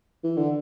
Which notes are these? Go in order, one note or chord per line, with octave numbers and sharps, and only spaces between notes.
E3
D3